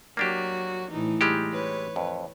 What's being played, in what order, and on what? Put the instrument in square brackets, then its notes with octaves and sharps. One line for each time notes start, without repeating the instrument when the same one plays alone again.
[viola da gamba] F#3 F#4 [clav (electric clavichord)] A#3 D4 G4
[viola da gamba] A2 E3 D#4
[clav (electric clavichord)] G3 G#3 G4
[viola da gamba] B4 C#5
[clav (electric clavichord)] F2